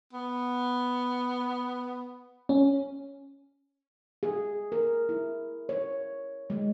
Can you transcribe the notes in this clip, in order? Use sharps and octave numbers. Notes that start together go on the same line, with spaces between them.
B3
C#4
G#4
A#4
E4
C#5
G#3